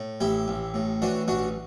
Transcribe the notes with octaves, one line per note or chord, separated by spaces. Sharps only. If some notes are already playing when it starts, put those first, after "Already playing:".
Already playing: A2
A1 E4 G4
A1
A2
E3 D4 F#4
A1 D4 F#4